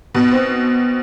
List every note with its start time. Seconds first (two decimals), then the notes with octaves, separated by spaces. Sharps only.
0.15 B2
0.31 C4